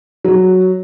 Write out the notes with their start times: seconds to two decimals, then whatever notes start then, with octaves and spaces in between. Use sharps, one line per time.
0.24 F#3